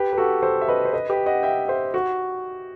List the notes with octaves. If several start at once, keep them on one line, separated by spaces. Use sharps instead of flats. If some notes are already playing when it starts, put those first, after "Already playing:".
Already playing: G4 B4
B4
F#4 A4
A4 C5
E5
B4 D#5
C5
B4 D#5
G4 B4
D#5 F#5
E5 G5
C5 E5
F#4